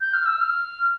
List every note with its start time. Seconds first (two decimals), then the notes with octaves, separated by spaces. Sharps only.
0.01 G6
0.13 F6
0.25 E6
0.39 F6